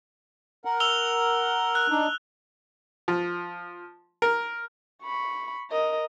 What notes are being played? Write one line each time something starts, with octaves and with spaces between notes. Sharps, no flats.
A#4 F#5
E6 F7 G7
F#6
D4 D#4
F3
A#4
B5 C#6
A#4 D#5